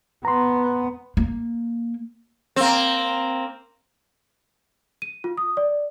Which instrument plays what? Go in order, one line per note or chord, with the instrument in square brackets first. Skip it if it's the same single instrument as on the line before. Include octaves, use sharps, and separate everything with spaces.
[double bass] B3 [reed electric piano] A#5 C6
[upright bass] A#3
[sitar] A#3 C4
[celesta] D#7
F4
D#6
D5